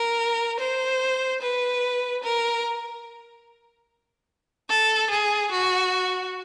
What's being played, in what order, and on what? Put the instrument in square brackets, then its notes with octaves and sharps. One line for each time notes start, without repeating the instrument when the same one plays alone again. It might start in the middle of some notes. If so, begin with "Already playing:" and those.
Already playing: [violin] A#4
C5
B4
A#4
A4
G#4
F#4